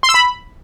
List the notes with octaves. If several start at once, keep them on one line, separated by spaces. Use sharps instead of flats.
C6
E6
B5